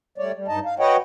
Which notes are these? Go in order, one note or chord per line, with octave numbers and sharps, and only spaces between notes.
G3 A3 C#5 D5
G3
G2 D#4 D#5 A5
F5
F#4 B4 C#5 D#5 F#5 G5